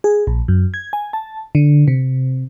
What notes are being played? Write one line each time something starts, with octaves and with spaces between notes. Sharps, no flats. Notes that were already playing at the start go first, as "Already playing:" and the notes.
G#4
A#1
F#2
G#6
G#5
A5
D3
C3